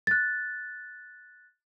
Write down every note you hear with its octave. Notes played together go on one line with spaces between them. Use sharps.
F#6 A6